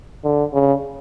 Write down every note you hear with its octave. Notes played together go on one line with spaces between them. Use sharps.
D3
C#3